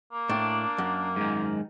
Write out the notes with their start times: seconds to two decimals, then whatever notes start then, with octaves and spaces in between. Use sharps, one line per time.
0.12 A#3
0.29 A2 D4
0.78 F#2
1.16 G#2 D#3